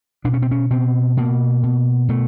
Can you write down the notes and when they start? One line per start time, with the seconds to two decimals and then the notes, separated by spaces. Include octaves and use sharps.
0.25 B2 D4
0.34 C#4
0.42 C4
0.51 C#4
0.70 B2 C4
1.17 B2 A#3
1.63 B2
2.09 B2 A3